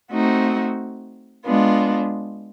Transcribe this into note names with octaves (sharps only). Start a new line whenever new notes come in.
A3 C4 D#4 F#4
G#3 B3 D4 F4